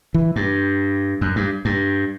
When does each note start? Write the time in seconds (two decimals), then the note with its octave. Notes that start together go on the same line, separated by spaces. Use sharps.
0.14 E3
0.36 G2
1.21 F#2
1.36 G2
1.65 G2